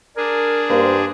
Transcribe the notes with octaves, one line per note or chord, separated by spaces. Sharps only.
D4 G#4 A#4
G2 A#3 C5